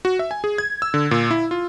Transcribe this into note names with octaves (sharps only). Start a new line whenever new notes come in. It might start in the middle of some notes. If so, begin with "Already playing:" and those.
F#4
E5
G#5
G#4
G#6
E6
D3
A#2
E4
F4